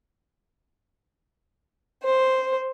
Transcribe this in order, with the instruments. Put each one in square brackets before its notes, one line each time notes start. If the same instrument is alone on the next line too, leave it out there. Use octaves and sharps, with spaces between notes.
[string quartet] C5